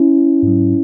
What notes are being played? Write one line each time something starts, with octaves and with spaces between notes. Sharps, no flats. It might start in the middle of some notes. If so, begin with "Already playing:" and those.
Already playing: C#4 E4
G#2 F#3